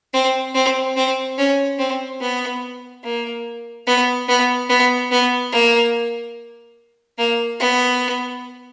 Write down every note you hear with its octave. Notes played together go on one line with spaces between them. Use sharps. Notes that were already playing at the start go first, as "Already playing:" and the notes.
C4
C4
C4
C#4
C4
B3
A#3
B3
B3
B3
B3
A#3
A#3
B3